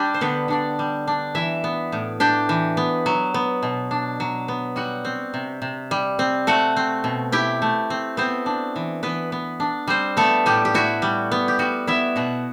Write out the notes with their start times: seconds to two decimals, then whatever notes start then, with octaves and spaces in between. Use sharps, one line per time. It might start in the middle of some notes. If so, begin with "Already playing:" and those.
Already playing: G3 D4 G4
0.14 C5
0.21 D3 B3 B4
0.48 D3 D4 D5
0.79 G3
1.07 D4
1.35 E3 E4 E5
1.64 B3
1.92 A2
2.20 D4 G4 G5
2.49 E3
2.77 B3
3.06 F#3
3.34 B3
3.63 B2
3.91 D4
4.20 F#3
4.48 B3
4.76 G3 F#4 F#5
5.05 C4
5.34 C3
5.62 C3
5.91 G3
6.19 C4
6.47 A3 F#4 F#5
6.76 C4
7.04 B2
7.32 E4 G4 G5
7.62 A3
7.90 C4
8.17 B3 C4 C5
8.46 D4
8.76 E3
9.03 E3 B3 B4
9.32 B3
9.60 D4
9.87 G3 C4 C5
10.17 A3 B3 A4
10.46 A2 G3 G4
10.65 G4
10.74 E4 F#4
11.02 G3
11.31 B3
11.48 G4
11.59 G3 F#4
11.87 B3 E4 E5
12.16 B2 F#4 F#5